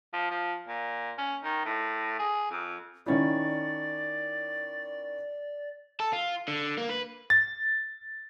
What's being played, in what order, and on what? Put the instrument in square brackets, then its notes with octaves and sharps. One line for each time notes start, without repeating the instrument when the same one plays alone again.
[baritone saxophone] F3
F3
A#2
C#4
D#3
A2
G#4
F2
[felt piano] D#3 C#4 E4 [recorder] D5
[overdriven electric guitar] A4
F4
D3
A#3
B4
[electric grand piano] A6